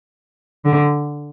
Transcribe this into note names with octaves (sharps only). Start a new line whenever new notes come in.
D3